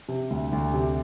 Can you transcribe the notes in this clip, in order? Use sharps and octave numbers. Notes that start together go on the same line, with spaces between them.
C3
D2
D2
C3